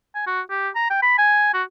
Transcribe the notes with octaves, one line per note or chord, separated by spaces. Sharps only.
G#5
F#4
G4
A#5
G5
B5
G#5
F#4